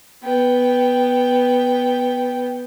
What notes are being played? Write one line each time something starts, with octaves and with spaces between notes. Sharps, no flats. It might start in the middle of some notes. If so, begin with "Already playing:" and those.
B3 G5